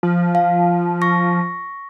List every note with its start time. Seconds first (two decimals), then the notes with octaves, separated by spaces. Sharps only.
0.03 F3
0.35 F5
1.02 C#6 A#6